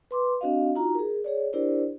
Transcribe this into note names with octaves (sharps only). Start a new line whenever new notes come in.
B4 C6 D6
C4 D4 F#4 D#5 F5
D#4 F4 F#4 A#5
G#4 A#4
G#4 C#5 D5
D4 E4 G4 A#4 C5 D5